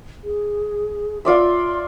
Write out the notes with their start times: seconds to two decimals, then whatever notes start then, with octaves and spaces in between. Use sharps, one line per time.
0.24 G#4
1.25 F4 D5 E5 C6